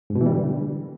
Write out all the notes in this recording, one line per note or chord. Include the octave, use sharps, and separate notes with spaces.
G#2
B2
E3
G3
D3